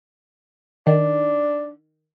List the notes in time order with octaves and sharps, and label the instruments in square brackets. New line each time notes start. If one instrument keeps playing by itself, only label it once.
[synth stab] D#3 [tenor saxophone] D4